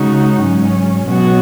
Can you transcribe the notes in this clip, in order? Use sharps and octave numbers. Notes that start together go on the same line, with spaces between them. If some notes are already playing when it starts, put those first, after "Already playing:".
Already playing: C#3 G#3 D#4 F#4
G#2 F#3 C#4
B2 F#3 B3 F#4